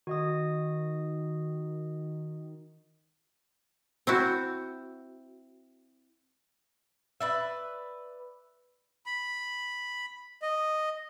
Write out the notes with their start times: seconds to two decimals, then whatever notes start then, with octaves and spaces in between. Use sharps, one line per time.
0.07 D#3 F#4 D#5 D#6
4.07 C4 E4 F#4
7.20 B4 D5 E5
9.06 B5
10.42 D#5